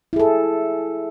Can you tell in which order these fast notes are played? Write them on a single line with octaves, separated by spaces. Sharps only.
E4 G#4 A4